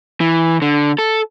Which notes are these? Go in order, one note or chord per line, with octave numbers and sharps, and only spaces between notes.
E3
D3
A4